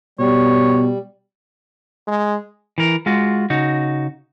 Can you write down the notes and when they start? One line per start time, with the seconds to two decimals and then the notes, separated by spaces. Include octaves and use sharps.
0.19 B2 G3 C#5
2.08 G#3
2.78 E3 A#4
3.06 G#3 F4 F#4
3.50 C#3 D#4 F#4